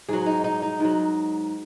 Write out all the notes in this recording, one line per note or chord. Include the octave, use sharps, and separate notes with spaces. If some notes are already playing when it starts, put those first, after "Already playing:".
G#2 F#3 G#4
D#4
D#4
D#4
G#2 F#3